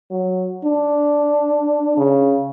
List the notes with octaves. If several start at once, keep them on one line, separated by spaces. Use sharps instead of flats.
F#3
D4
C#3